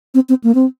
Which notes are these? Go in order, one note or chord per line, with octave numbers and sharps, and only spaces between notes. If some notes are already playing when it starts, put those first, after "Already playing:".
C4
C4
A#3
C4